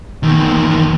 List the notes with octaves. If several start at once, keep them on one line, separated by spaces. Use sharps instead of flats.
E2 D#3